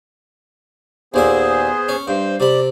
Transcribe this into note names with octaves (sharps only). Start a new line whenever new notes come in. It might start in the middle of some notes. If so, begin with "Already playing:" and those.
D#2 A#2 B3 G#4 C5 E5
C#4
G2 C5
C3 D5 B5